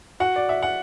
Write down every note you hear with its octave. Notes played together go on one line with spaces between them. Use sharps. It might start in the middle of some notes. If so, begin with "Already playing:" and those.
F#4 F#5
D5
E5
F#5